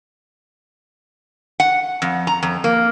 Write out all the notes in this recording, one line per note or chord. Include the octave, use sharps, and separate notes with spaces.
F#5
F2
A#5
F2
A#3